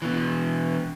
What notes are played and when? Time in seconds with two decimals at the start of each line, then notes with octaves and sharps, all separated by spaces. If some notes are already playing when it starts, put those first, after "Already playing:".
0.02 B2 E3